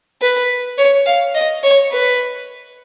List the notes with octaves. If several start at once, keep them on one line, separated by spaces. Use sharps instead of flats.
B4
C#5
F5
D#5
C#5
B4